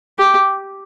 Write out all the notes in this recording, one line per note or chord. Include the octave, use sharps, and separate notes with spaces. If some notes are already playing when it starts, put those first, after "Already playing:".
G4